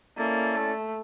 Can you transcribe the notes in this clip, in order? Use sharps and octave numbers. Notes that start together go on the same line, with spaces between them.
A#3 C#4 E4 A4 D5
A3